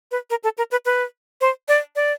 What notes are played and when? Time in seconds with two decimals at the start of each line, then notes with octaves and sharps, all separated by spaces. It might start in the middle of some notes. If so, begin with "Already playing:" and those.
0.11 B4
0.30 A#4
0.44 A4
0.58 A#4
0.71 B4
0.85 B4
1.41 C5
1.68 D5
1.96 D5